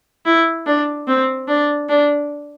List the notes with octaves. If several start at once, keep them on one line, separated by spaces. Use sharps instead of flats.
E4
D4
C4
D4
D4